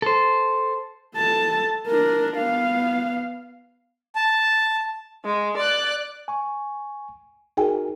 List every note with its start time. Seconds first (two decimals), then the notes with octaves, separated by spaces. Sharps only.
0.02 A4 C5
1.16 A4 A5
1.87 D4 A#4
2.37 B3 F5
4.15 A5
5.25 G#3
5.57 D5 F#6
6.28 G#5 C#6
7.57 D#4 F#4 G#4 A#4 G5 G#5